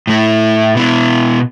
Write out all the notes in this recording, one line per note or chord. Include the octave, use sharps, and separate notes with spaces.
A2 A3 E4
B2 B3 E4